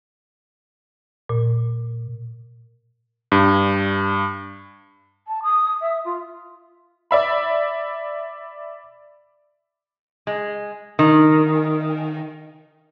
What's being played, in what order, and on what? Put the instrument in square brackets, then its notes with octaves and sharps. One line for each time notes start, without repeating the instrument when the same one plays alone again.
[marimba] A#2
[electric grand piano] G2
[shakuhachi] A5
D#6
E5
F4
[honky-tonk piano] D5 E5 B5
[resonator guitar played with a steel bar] G#3
D#3